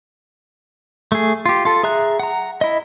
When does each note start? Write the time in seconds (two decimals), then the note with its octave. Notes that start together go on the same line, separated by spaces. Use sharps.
1.12 A3 G#4
1.46 F4 G4
1.65 F4 A4
1.83 G#4 E5 A#5 F#6
2.19 F#5 A#5
2.61 E4 D#5